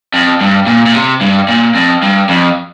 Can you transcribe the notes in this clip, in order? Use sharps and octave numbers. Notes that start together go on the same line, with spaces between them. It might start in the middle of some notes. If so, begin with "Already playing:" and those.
F2
G2
A#2
A#2
C3
G2
A#2
F2
G2
F2